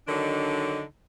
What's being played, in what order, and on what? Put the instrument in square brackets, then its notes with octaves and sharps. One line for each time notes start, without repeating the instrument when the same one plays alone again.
[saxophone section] D3 D#3 F#3 D4 D#4